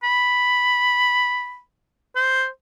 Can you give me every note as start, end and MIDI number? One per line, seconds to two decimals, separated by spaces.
0.03 1.60 83
2.16 2.48 72